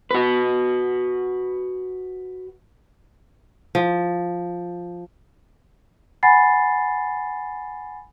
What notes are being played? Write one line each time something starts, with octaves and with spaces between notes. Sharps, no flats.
F#4 B4
F3
F#5 G#5 B5 A6 C7